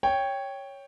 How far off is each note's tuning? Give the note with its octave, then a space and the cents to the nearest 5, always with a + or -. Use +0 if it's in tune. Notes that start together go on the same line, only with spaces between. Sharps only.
C#5 +0 G5 +5